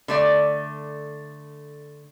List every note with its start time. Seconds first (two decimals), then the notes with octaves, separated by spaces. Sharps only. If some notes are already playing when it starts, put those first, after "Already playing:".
0.08 D3 A3 D5